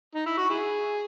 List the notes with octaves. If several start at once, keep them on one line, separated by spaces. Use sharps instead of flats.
D#4
E4
F#4
E4 G#4